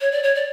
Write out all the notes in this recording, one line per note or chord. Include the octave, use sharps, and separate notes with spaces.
C#5
D5
C#5
D5